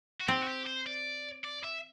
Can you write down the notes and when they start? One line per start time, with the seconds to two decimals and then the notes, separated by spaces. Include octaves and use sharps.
0.21 F#4
0.28 C4 G4
0.43 F#4
0.48 G4
0.67 C5
0.86 D5
1.44 D5
1.64 E5